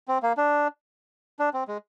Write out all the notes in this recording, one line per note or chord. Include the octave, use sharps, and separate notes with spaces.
C4
A#3
D4
D4
C4
G#3